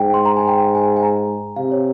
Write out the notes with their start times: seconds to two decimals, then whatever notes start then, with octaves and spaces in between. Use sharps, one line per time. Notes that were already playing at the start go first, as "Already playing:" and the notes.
Already playing: G#2 G5
0.14 C6
0.25 A#5
0.37 G#5
0.48 G5
0.75 G#5
0.97 G#5
1.03 A#5
1.56 C3 F5
1.72 C#5